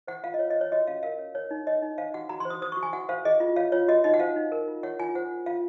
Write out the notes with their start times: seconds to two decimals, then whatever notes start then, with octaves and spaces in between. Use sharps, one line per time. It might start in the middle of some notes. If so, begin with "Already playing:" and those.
0.07 C5 F#5
0.24 F4 F5
0.34 D#5
0.39 F4 C#5
0.50 D#5
0.55 C5
0.61 C#5
0.72 F#4 D#5
0.87 C#4 F5
1.03 A#4 F5
1.19 C#5
1.35 A#4 C#5
1.51 D#4
1.67 C#5 D#5
1.82 D#4
1.98 C5 F5
2.14 F#4 F#5
2.29 F#4 A#5
2.40 C6
2.45 C5
2.50 D#6
2.62 C5 D#6
2.72 C#6
2.77 F#4
2.83 G#5
2.93 F#4 F#5
3.09 C5 F5
3.25 G#4 D#5
3.40 F4
3.56 C#5 F5
3.72 F4 C#5
3.88 F#4 D#5
4.04 D#4 D#5
4.14 F#5
4.20 C5 F5
4.36 D#4
4.52 A#4
4.68 F4
4.83 C#5 F#5
5.00 F4 G#5
5.15 C5 F#5
5.31 F4
5.46 F4 F5